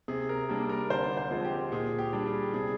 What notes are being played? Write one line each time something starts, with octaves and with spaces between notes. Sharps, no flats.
C3 G#4
A#4
G3 A#3 D4
A#4
D3 C5
C5
F3 G#3 C4
G4
A#2 G#4
G4
G3 D4
G#4
C3 G#4